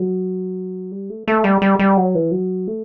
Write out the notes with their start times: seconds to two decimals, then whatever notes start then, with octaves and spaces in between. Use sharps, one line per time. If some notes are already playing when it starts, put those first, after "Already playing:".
Already playing: F#3
0.91 G3
1.10 A3
1.28 A3
1.44 G3
1.62 G3
1.79 G3
1.97 F#3
2.15 E3
2.31 F#3
2.67 A3